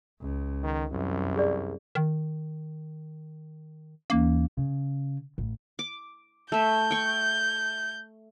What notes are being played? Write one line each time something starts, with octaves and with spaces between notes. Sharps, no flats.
C#2
D#3
C2 F#2
G#4 D5
D#3
D#2 E3 A#3 C#4
C#3
A1
D6
A3 E5 G6
G5 C#6